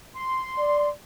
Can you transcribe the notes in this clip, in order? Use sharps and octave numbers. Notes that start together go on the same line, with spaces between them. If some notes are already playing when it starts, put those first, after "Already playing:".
C6
D5